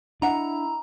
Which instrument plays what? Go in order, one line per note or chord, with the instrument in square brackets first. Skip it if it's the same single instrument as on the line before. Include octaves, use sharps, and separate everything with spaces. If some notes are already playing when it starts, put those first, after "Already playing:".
[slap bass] D4 [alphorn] E4 [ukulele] D#5 F#5 [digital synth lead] A#5